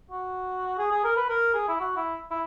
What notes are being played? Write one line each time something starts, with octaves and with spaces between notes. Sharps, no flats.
F#4
G#4
G#4
A#4
B4
A#4
G#4
E4
F#4
E4
E4